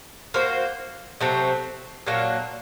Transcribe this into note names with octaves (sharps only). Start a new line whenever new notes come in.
A#3 F#4 C5
C3 F#3 A3 C4
A#2 F#3 A#3 D4